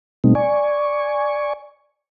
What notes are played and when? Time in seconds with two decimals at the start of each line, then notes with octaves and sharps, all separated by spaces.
0.24 B2 G3 A3 C4 D#4
0.35 D5 G#5 C#6